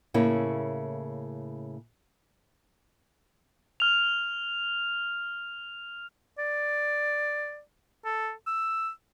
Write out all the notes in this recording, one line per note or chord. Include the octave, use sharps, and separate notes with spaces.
A2 C#3 A#3 C#4 E4
F6 F7
D5
A4
E6